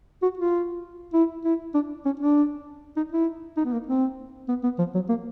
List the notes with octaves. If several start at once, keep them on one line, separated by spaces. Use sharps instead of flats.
F#4
F4
E4
E4
D4
C#4
D4
D#4
E4
D#4
B3
A#3
C4
B3
B3
F3
F#3
A#3